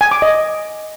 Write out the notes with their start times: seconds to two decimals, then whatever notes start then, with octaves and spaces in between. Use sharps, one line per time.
0.01 G#5
0.11 D6
0.22 D#5